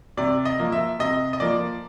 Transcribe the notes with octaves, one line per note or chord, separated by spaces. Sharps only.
C3 D5
D#5
F3 A#3
E5
C3 D#5
D#5
F3 A#3 D5